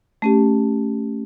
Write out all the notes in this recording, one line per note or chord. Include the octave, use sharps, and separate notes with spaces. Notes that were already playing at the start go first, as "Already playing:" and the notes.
A3 C#4 G4